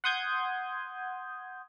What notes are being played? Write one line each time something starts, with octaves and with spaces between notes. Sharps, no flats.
F#5 C6 D#6 G6 G#6